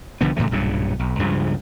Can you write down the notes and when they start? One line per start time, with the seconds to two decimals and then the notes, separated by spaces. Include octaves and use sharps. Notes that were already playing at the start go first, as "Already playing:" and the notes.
0.21 C2 D3 F3 B3
0.37 A2 C#3 E3 A3
0.51 B1 G2 A#2 C#3
0.99 B1
1.19 C#2 G2 C#3 F3